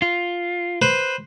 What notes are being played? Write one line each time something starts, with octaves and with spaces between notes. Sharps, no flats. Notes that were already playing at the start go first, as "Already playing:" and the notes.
F4
B4 C5